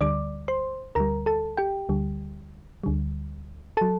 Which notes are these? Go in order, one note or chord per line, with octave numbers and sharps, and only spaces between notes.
D2 D3 G3 D5 D6
C5 C6
D2 D3 G3 A#4 A#5
A4 A5
G4 G5
D2 D3 G3
D2 D3 G3
F#3 A4 A5